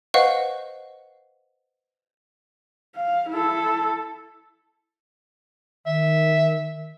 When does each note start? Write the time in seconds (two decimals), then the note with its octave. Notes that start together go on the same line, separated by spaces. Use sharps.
0.14 B4 C5 D#5 F5 F#5 C#6
2.95 F5
3.30 E4 A4
5.86 D#3 E5